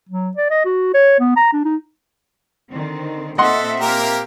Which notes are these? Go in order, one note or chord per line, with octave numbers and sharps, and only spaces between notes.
F#3
D5
D#5
F#4
C#5
B3
A#5
D4
D#4
D3 D#3 C4
A#2 C4 A4 D#5 E5 F#5 C6
A#3 G4 A#4